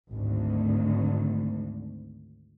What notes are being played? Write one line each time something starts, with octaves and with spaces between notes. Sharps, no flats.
G#1 D2